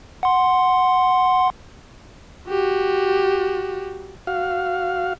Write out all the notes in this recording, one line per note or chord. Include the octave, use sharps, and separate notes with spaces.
F#5 C6
F#4 G4
F#4 F5